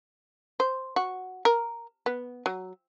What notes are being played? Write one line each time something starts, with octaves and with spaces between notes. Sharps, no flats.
C5
F#4
A#4
B3
F#3